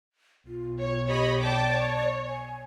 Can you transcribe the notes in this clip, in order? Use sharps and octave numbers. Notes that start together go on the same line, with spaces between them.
B1 F4
C#5
G4 C#5 D#5 B5
D5 G5 A5 D6
C#5
G#5